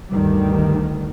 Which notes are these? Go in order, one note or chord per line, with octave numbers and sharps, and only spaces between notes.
D2 G2 D#3 G3